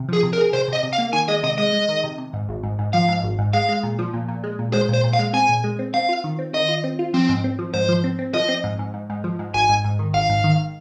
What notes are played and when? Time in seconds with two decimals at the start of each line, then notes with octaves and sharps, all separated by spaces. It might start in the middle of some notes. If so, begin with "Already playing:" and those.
Already playing: C3
0.09 F3 G#4
0.23 C3
0.33 A#4
0.38 G#4
0.53 C3 C5
0.68 C3 D#5
0.83 C3
0.93 F5
0.98 A#3
1.13 D#3 G#5
1.28 G#3 D#5
1.43 C3 D#5
1.58 G#3 D#5
1.73 G#3
1.89 D#3
2.04 C3
2.18 C3
2.33 G#2
2.49 G#1
2.63 G#2
2.79 G#2
2.93 F3 F5
3.08 G#2
3.23 G#1
3.38 G#2
3.53 G#3 F5
3.69 G#3
3.83 A#2
3.99 F3
4.14 A#2
4.28 A#2
4.44 G#3
4.59 A#2
4.73 G#3 C5
4.89 A#2 C5
5.04 A#2
5.13 F5
5.19 G#3
5.33 C4 G#5
5.49 A#2
5.64 G#3
5.79 C4
5.94 C4 F5
6.09 F4
6.24 D#3
6.39 C4
6.54 D#3 D#5
6.68 F4
6.84 C4
6.99 F4
7.14 F3 C4
7.29 G#2
7.44 C4
7.59 F3
7.74 G#2 C5
7.89 F3
8.04 C4
8.19 C4
8.34 F3 D#5
8.49 C4
8.64 G#2
8.79 G#2
8.94 G#2
9.10 G#2
9.24 F3
9.39 G#2
9.54 G#1 G#5
9.69 G#2
9.85 G#2
9.99 D#3
10.14 G#1 F5
10.29 G#2
10.44 D#3